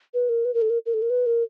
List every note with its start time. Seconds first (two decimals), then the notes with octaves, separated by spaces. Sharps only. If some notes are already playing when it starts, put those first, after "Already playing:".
0.14 B4
0.29 A#4
0.45 B4
0.54 A#4
0.62 A4
0.70 A#4
0.86 A#4
0.94 A4
1.02 A#4
1.10 B4
1.26 A#4